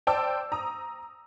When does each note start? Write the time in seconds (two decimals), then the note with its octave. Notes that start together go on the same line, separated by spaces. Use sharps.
0.07 C5 D5 G5 A5 D6 E6
0.52 A#5 D#6